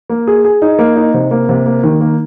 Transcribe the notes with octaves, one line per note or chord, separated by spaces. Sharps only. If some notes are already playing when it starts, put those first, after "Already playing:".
A#3
G#4
G#4
D#4
A#3
D#4
C3
A#3
C3
A#3
D#3
A#3